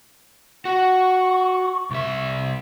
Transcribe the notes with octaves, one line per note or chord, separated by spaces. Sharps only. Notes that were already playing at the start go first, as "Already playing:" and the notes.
F#4 F#5 C#6
C2 E5